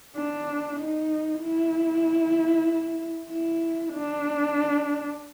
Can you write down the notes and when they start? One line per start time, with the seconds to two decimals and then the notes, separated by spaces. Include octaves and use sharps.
0.16 D4
0.79 D#4
1.42 E4
3.31 E4
3.93 D4